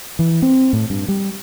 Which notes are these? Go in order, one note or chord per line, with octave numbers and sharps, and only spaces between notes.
E3
C4
A2
G2
G3